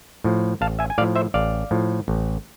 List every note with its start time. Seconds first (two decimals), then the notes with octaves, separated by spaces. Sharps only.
0.24 A2 F3
0.61 A1 F5 A5
0.79 E5 G#5
0.90 G#5
0.98 A2 D5 F5
1.01 F3
1.16 C5 E5
1.34 A1 D5 F5
1.71 A2 F3
2.08 A1